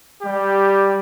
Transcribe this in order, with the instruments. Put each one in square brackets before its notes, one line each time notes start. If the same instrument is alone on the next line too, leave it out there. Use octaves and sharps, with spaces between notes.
[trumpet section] G3 G4